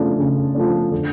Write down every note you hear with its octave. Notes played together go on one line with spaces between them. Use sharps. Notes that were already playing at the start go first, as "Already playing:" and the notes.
Already playing: C#3 F3 A3 D4
C#3
F3 A3 D4
D3